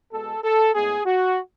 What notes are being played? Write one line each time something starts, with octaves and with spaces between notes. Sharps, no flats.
B2 G#3 B3 A4
A4
A2 G#3 B3 G#4
F#4